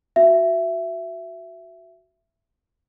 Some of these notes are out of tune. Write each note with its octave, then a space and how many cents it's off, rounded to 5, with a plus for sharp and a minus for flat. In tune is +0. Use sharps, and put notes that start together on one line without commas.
F#4 +0 E5 +15